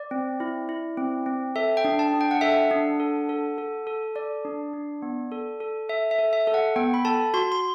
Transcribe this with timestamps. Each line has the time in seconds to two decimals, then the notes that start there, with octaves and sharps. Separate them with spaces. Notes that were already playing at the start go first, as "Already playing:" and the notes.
Already playing: D5
0.11 C4
0.40 E4
0.69 E4
0.97 C4
1.26 C4
1.56 A4 E5
1.77 G5
1.85 D4
1.99 A5
2.13 D4
2.21 G5
2.31 F#5
2.41 A4 E5
2.51 F#5
2.71 D4
3.00 A4
3.29 A4
3.58 A4
3.87 A4
4.15 A4 D5
4.45 D4
4.73 D4
5.02 B3
5.32 A4
5.60 A4
5.89 A4 E5
6.11 E5
6.19 A4
6.33 E5
6.47 A4
6.54 F#5
6.76 B3 G5
6.94 B5
7.05 A4 A5
7.34 F#4 C6
7.52 C6